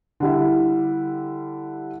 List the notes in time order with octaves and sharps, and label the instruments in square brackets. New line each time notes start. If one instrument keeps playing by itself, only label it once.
[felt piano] D3 G3 E4